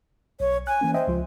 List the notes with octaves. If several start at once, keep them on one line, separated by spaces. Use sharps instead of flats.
B1 C#5
G#5 F#6
E3 A#3 C#4
C5 D#5 E5 G5
C#2 F3 F4